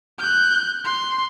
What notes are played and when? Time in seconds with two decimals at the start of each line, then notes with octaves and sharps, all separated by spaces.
0.19 F#6 G6
0.85 C6